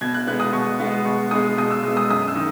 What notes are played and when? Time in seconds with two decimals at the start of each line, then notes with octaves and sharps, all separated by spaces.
0.01 B2 G#6
0.14 F#6
0.27 G#3 B3 F#6
0.40 D#6
0.53 B2 C#6
0.80 G#3 B3
1.05 B2 C#6
1.31 G#3 B3 D#6
1.57 B2 D#6
1.71 E6
1.83 G#3 B3 E6
1.97 D#6
2.10 F#2 D#6
2.28 E6
2.35 D#3